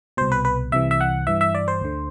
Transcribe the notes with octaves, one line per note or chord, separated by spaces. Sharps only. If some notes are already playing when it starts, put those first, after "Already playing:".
C2 B2 C5
B4
B4
C2 C3 E3 E5
E5
F#5
G2 E3 E5
E5
D5
C5
D2 D3